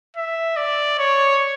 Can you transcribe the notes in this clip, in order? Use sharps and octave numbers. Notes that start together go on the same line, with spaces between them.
E5
D5
C#5